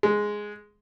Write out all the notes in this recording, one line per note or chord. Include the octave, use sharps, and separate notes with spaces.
G#3